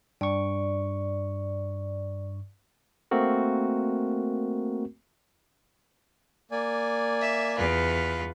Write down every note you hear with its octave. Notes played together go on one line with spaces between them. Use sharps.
G2 D5 C#6
A3 A#3 C4 F#4 A#4
A#3 D5 G#5
E5
E2 F4 B4